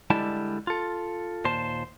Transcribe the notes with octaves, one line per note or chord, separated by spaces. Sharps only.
D3 G3 G#3 E4 A5
F4 A4
D#2 A#2 C5 A5